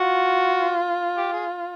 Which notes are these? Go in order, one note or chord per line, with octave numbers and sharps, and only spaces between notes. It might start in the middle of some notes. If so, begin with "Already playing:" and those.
Already playing: F4 F#4
G4
G#4